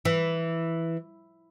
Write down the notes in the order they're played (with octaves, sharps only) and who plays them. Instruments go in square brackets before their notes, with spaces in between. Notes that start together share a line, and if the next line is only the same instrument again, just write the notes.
[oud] E3